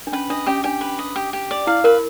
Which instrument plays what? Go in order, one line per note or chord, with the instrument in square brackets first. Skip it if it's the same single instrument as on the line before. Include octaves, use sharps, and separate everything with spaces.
[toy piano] D4
[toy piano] C#4 [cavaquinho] B4
[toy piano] D4 [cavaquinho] D#5
[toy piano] C#4 [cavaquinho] G4
[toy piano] D4 [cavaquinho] G4
[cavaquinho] B4
D#5
G4
G4
D5
[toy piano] E4 [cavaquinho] F5
[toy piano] A#4 [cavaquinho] B4